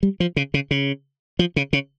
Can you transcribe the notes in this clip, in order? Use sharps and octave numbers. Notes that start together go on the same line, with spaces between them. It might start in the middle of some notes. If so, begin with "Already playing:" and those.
G3
F3
C#3
C#3
C#3
F3
C#3
C#3